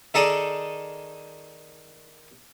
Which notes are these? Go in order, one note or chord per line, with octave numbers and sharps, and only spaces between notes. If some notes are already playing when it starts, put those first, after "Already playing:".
D#3 D#4 G#4 A4 D5 D#5